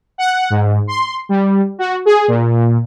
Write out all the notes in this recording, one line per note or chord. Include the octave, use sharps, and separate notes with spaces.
F#5
G#2
C6
G3
F#4
G#4
A#2